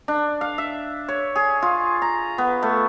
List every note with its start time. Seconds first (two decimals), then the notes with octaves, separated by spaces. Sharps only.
0.08 D4
0.41 F5
0.58 E5
1.08 C#5
1.36 G#4
1.62 F4
2.02 A#5
2.38 B3
2.63 A3